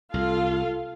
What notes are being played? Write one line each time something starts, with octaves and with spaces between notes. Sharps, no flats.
C2 F4 A4 F5